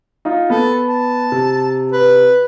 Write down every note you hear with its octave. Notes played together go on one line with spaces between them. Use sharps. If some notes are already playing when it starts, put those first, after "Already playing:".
D#4 F4
B3 A4
A5
C3
B4